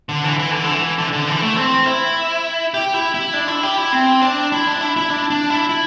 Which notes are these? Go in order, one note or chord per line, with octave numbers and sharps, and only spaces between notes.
D3
E3
E3
D3
E3
D3
D3
E3
A3
C4
E4
G4
E4
E4
D4
E4
G4
E4
C4
D4
E4
D4
E4
E4
D4
D4
E4
E4